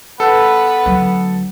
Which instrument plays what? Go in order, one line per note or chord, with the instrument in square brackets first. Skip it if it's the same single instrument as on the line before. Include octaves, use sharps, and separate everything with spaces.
[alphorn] B3 [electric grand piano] A4 [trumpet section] B4
[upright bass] D2 F#3